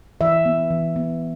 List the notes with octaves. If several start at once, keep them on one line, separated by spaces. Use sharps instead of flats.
E3 E5
B3
E3
B3